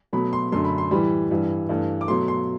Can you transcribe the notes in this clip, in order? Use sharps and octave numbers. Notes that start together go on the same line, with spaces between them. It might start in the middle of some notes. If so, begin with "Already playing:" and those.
B2 F#3 A3 B5
C6
F#2 D3 A3 C6
B5
C6
A2 E3 G3 B5
G2 E3 G3
G2 E3 A3
D6
B2 F#3 A3 C6
C6